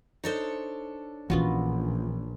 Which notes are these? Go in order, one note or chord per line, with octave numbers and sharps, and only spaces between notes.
D4 D#4 A4 C5 C#5
A#1 E3 B3 C#4 F4 F#4